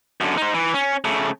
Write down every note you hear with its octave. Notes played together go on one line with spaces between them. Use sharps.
F#2 D3
D#4 C5
E3
C#4
C#3 A3